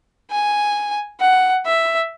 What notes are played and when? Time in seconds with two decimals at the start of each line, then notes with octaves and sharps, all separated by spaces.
0.31 G#5
1.21 F#5
1.65 E5